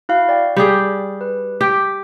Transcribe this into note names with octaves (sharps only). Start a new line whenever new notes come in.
E4 F#4 F5
D5 G5
G3 G4 G#4
B4
G4 B6 D7